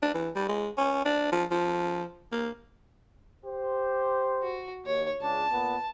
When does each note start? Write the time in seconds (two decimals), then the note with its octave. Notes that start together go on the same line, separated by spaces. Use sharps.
0.03 D4
0.14 E3
0.36 G3
0.48 G#3
0.78 C#4
1.05 D4
1.32 F3
1.51 F3
2.32 A#3
3.46 G4 C5
4.42 F#4
4.86 D#2 C#5
5.21 C#2 C#3 D4 A5
5.51 A#2 B3